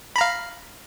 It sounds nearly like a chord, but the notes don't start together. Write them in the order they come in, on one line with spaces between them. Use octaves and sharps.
B5 A#5 F5